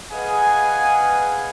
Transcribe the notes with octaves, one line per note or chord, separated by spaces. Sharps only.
G#4 B4 D#5 F5 F#5 G#5